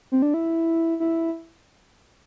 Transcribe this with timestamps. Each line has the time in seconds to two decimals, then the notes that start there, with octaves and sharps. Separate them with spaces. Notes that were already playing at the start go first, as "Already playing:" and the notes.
0.12 C4
0.22 D4
0.34 E4
1.00 E4